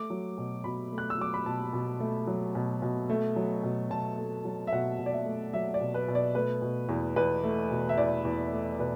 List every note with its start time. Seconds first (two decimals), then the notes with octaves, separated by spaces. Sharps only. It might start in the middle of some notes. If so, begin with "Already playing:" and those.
Already playing: A3 D6
0.10 F#3
0.38 B2
0.64 B2 B5
0.92 A3
0.98 F#6
1.10 E6
1.18 F#3 D6
1.34 B5
1.46 B2 A5
1.73 B2
2.00 A3
2.27 F#3
2.55 B2
2.82 B2
3.09 A3
3.36 F#3
3.63 B2
3.90 B2 A5
4.18 A3
4.45 F#3
4.67 E5
4.72 B2 F#5
4.99 B2
5.06 D5
5.13 E5
5.26 A3
5.53 F#3 E5
5.74 D5
5.81 B2
5.94 B4
6.08 B2
6.15 D5
6.35 A3 B4
6.62 B2
6.89 E2
7.16 E2 B4
7.44 A3
7.71 B2
7.89 E5
7.98 E2 D5
8.25 E2
8.52 A3
8.79 B2 B4